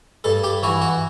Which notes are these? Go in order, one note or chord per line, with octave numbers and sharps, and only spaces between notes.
G2 A4
G4
E3 F#4
F#4